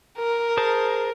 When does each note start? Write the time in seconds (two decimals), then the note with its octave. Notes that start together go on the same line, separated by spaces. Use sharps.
0.18 A#4
0.57 G#4 C5 A5